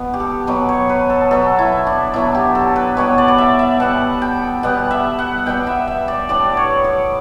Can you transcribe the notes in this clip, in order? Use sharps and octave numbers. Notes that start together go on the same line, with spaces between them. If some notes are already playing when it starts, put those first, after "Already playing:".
Already playing: B2 B3
G4
A4
B2 F#3 B3 B4
C#5
B4
A4
B2 F#3 B3 A4
E4
D4
B2 F#3 B3 E4
G4
A4
B4
B2 G3 B3 C#5
D5
D5
E5
E5
B2 G3 B3 F#5
G5
B2 G3 B3 F#5
E5
F#5
B2 G3 B3 G5
E5
E5
D5
A2 G3 B3 D4 D5
C#5
D5